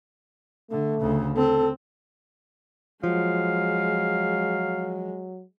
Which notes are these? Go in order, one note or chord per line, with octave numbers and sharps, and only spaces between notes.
D3 A3
D2 C#3
C4 A4
F3 F#3 G#3 F5